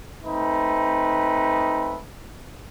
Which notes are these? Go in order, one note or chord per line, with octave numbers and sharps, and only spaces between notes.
A3 C4 D#4 B4